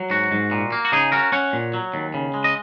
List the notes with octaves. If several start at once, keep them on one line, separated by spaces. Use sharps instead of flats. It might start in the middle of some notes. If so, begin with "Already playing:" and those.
Already playing: F#3
G#2 F#4
G#2
A#2
A#3
F#4
C#3 D#4 G#4
C#4 F#4 A#4
C#4 C#5 F#5
A#2
F#3
D#2
C#3
G#3
D#5